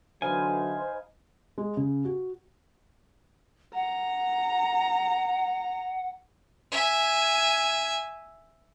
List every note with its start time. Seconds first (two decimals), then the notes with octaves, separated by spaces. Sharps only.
0.22 D3 E3 F#3 D#4 B4 C5 F5 G#5
1.58 G#3
1.77 C#3
2.05 F#4
3.74 F#5 A#5
6.72 E5 G#5